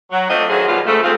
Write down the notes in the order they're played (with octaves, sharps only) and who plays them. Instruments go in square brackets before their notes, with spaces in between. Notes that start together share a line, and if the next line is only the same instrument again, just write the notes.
[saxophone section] F#3
A3 C4 D4 F4 D#5
D#3 F#3 C4 F#4 G#4
B2 F#3 G3 B3 F4
C#3 F3 A3
G#3 C4 D#4 F4